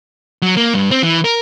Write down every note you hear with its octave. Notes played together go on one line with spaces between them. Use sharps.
F#3
A#3
G2
C4
E3
A#4